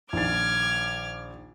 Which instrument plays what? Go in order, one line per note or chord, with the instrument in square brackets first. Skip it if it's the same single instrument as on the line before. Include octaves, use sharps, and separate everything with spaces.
[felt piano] A#1 D#3 A6 [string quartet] D6 F6 G#6